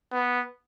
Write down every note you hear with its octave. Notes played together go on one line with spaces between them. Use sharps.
B3